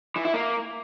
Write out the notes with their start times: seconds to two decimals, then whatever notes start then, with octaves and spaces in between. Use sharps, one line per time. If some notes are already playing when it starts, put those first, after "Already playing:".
0.16 E3
0.25 E4
0.34 A#3